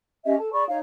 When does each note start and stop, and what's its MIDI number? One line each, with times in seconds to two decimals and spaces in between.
0.25 0.34 61
0.25 0.34 67
0.25 0.34 75
0.25 0.34 76
0.38 0.52 69
0.38 0.52 81
0.53 0.64 68
0.53 0.64 74
0.53 0.64 83
0.53 0.64 85
0.68 0.77 63
0.68 0.77 73
0.68 0.77 77